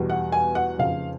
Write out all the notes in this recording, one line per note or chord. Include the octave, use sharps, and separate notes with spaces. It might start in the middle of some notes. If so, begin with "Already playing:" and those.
Already playing: E2 B2 G3
F#5
G#5
F#5
F1 F2 C#3 F3 F5